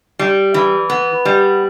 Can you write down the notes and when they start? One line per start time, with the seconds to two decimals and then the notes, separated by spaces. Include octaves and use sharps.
0.19 G3
0.54 E3
0.90 B3
1.25 G3